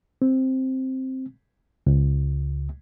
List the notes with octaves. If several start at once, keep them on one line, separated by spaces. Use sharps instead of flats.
C4
C#2